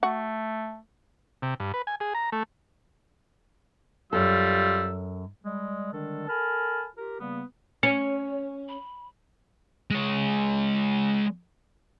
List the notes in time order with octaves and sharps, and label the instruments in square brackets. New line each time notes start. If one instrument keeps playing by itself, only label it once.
[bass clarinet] A3 [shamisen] F#4
[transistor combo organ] C3
G2
B4
G#5
G#4
A#5
A3
[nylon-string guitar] F#2 A4 [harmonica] G3 F4 E6
[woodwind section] G3 G#3
D3 D#3 G3 G#3 D4 A4
A4 A#4 G#5 A5 B5 F6
F4 G4 A#4
C#3 G3 A#3 B3
[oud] C#4 [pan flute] C#5 [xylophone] C#7
[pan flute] B5
[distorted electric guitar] G#3 C#5